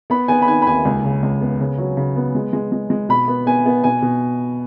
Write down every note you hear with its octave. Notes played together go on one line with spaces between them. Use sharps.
B3 B5
B3 G#5
B5
D#3 G#5
B5
D#2 G#5
C#2
C#3
C#2
B3
C#3
F#3
C#3
B3
G#3
G#3
G#3
G#3
B2 B5
B3
B3 G#5
B3
B2 G#5
B2